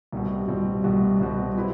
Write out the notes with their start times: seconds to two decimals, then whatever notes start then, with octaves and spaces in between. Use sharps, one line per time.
0.12 C2 B2 G3 C4 F#4
0.48 C2 B2 G3 C4 F#4
0.84 C2 B2 G3 C4 F#4
1.20 C2 B2 G3 C4 F#4
1.56 F#3 C4 E4 B4